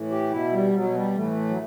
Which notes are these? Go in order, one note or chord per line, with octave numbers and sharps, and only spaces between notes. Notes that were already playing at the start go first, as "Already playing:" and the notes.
Already playing: A2 E3
G4
B2 E4
G3
B2 F#3
G3
A2 E3 A3
F#3